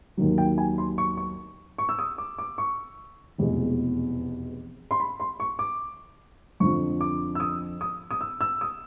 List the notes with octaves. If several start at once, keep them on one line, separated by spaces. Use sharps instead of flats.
D#2 D#3 F#3
G5
G#5
C6
C#6
C#6
C#6
E6
D#6
D6
D6
C#6
F1 E2 B2 G#3
C6
B5
C6
C#6
D6
F2 D3 F3 C#6
D6
E6
D#6
D#6
D#6
E6
E6
D#6